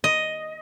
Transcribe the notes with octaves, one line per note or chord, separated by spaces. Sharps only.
D#5